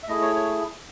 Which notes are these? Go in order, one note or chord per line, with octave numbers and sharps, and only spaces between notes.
E5
A3 E4 G#4 D#5
C#5
C#5